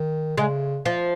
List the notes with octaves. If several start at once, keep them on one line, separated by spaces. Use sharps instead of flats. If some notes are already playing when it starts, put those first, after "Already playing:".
Already playing: D#3
C#3 G#3
F3